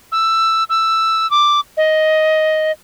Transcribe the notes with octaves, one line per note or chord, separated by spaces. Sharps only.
E6
E6
D6
D#5